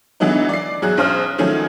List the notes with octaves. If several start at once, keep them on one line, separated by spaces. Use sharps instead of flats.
D3 E3 F#3 B3 D#4
D5 C7
E2 F#3 G#4 F#6
B1 C#4 C5 D#6 F6
D#3 F3 F#3 A3 C#4